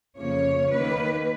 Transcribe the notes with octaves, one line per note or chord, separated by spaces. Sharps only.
F2 C#3 F3 A#3 C#5
D#2 D#3 A#3 B4